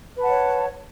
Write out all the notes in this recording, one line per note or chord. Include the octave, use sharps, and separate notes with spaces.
B4 C#5 F#5 A5